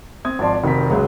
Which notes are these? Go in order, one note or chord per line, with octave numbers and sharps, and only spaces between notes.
C4 D#6 G#6
G#1 F3 D5 A5 C6
F1 D#3 C4 F#4 A#5 B6
C#2 G#2 F#3 G#3